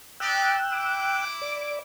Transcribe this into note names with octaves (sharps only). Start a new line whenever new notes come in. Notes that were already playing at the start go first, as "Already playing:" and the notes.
D#4 G4 D5 G5 E6 F#6
E4 D6
D5